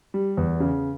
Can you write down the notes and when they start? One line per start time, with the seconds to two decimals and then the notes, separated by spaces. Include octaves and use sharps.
0.14 G3
0.37 E2
0.60 C#3